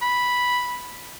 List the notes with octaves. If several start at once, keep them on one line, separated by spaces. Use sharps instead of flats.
B5